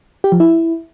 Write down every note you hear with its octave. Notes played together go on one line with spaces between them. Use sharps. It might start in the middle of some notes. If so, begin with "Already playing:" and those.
G4
F3
E4